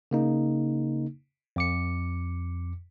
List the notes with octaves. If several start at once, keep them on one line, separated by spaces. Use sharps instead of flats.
C#3 A#3 D#4
F2 D6 C#7